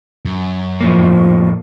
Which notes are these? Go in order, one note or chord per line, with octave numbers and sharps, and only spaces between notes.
F#2
F2 A2 F3 A#3